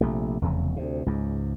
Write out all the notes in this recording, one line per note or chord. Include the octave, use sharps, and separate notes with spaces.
A#1 C3 A3
F1 E2 C#3
D2 C3
C#2 G#2